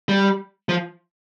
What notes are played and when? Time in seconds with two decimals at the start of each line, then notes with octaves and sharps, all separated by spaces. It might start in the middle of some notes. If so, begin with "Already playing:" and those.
0.09 G3
0.69 F3